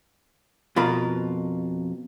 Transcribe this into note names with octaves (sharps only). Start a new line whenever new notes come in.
F2 B2 F4 A#4 B5